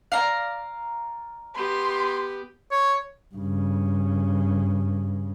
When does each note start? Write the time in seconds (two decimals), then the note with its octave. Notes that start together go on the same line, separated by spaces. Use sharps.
0.12 D5 F5 A#5
1.56 B3 G4 C6
2.71 C#5
3.34 G2 C#3